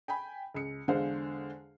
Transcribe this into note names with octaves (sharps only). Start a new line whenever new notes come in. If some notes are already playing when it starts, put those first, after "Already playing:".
G5 G#5 B5
C#2 C#7
E2 D3 G#3 C5 F5